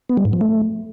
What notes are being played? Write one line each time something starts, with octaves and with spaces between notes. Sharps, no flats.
B3
G3
G#2
F3
A3